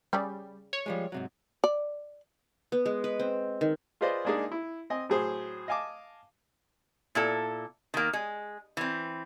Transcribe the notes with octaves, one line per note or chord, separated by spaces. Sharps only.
C#3 G3 C#4 D5
C#5
F3 G3 G#3
G#2 C3 F#3
D5
B3
G#3
B4
C4
D#3
F4 G#4 B4 C5 D5 D#5
G#3 A#3 D4 D#4 G#4 D5
E4
C4 D#5 G#5
A2 F#3 G#4 C5
D#5 F5 G#5 A5 D6
A#2 E4 A4
D#3 A#3
G#3
E3 C4